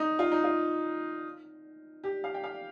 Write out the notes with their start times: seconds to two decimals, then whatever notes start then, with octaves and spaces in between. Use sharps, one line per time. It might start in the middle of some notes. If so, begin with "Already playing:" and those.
Already playing: D#4
0.19 F4
0.32 D#4
0.44 F4
2.04 G4
2.24 F5
2.34 G5
2.44 F5